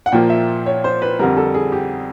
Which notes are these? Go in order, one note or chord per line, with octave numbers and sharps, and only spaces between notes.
F#5
A#2 F3 A#3 G5
E5
C#5
C5
B4
F2 D3 G3 A#4
A4
G#4
G4